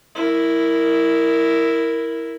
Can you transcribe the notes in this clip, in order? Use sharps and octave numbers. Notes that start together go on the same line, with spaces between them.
E4 A#4